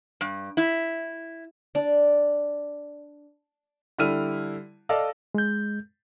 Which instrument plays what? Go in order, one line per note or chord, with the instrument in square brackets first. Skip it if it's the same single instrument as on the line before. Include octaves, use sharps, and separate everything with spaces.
[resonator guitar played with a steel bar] G2
E4
[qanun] D4 D5
[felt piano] D3 G3 E4 F6 D#7
A4 D5 D#5 F5
[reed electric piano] G#3 G6